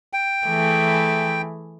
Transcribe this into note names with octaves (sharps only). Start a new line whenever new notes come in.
G5
E3 A3 G#4